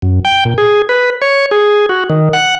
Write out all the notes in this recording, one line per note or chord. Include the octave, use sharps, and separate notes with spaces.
F#2
G5
A#2
G#4
B4
C#5
G#4
F#4
D#3
F#5